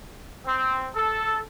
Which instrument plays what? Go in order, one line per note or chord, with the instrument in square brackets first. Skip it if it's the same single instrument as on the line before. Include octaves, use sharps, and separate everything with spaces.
[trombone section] C4
A4